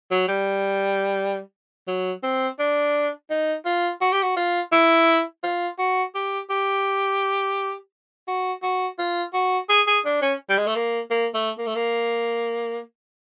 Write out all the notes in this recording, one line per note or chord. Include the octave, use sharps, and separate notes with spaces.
F#3
G3
F#3
C4
D4
D#4
F4
F#4
G4
F#4
F4
E4
F4
F#4
G4
G4
F#4
F#4
F4
F#4
G#4
G#4
D4
C#4
G3
G#3
A3
A#3
A#3
A3
A#3
A3
A#3